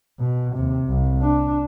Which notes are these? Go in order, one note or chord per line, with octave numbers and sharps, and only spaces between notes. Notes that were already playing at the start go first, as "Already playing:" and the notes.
B2
D#2 C3
C2
D4